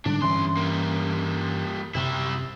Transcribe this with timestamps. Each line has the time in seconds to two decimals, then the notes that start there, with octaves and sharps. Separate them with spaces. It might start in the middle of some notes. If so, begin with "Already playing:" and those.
0.06 G#2 D3 G3 D4
0.22 C2 G2 E3 C#4 C6
0.57 G3 A#3
1.95 F#2 C3 G3 E4